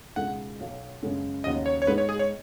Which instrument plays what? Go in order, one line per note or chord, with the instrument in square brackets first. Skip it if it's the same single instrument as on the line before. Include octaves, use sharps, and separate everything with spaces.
[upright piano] C#2 B2 G#3 D#4 [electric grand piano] F#5
[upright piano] B1 B2 F#3 B3
F#2 C#3 G#3 B3
[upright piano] D#2 C#3 F#3 B3 D#4 [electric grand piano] D#5
[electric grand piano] C#5
C#5
[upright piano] G#2 G#3 B3 D#4 [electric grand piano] B4
[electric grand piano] C#5
G#4
C#5